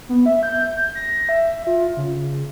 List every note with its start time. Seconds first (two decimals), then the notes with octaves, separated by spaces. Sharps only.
0.09 B3
0.26 E5
0.43 G6
0.95 A#6
1.29 E5
1.67 F4
1.97 C#3